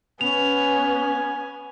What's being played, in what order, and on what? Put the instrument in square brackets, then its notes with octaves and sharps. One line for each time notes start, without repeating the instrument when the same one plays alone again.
[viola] B3 [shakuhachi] C#4 [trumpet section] G#5 [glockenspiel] F7